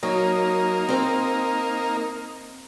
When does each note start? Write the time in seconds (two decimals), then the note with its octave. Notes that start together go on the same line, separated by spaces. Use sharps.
0.03 F#3 A#3 D#4
0.88 C4 C5